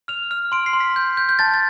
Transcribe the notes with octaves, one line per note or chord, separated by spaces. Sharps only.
F6 F7
F6
C6 D7
C7
C6
B6
G6
G6
G6
A5 A6
A6